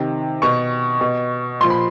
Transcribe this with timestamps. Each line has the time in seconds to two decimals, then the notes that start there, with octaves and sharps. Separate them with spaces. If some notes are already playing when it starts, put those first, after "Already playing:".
Already playing: C3 D#3
0.42 B2 C#6
1.01 B2
1.61 A#2 F3 C6
1.70 B5